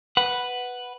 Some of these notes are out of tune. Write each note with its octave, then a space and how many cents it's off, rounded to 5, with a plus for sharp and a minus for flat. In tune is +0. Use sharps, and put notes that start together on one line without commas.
B4 +0 F#5 +0